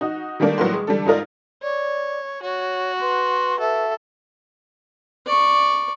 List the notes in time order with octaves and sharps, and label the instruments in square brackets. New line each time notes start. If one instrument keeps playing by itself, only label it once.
[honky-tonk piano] D#4 F#4
D#3 G3 A3 A#3 D4
A2 F#3 G3 A#3 B4 C6
G#3
D3 G3 D4 A4
G#2 D#4 F4 A#4 D5
[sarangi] C#5 [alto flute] D5
[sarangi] F#4 [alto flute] C#5
[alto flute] B4 [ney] C6
[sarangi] A4 [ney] E5
[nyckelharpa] D5 C#6